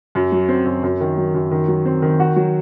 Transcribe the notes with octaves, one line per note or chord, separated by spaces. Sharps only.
F#2
F#3
C4
F#2
F#2
D#3
F#3
F#2
D#3
F#3
C4
D#3
F#4
F#3